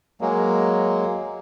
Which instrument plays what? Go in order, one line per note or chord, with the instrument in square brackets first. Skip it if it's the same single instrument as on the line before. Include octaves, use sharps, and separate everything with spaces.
[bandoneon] F#3 G#3 A#3